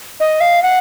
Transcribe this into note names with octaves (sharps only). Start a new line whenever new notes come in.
D#5
F5
F#5